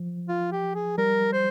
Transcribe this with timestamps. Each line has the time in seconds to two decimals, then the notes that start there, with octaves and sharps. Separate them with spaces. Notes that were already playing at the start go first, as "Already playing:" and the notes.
Already playing: F3
0.28 F4
0.52 G4
0.75 G#4
0.98 G3 A#4
1.33 C5